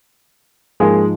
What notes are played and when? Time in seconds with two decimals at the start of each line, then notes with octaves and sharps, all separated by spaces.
0.80 G#2 F3 G#3 A#3 G#4